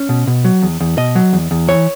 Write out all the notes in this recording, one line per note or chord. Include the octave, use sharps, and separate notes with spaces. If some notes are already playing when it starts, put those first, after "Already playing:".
Already playing: C#4
B2
B2
F#3
E2
E2
B2 D#5
F#3
E2
E2
E3 C#5